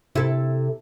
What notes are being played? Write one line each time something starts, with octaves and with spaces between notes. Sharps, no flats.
C3 E4 A4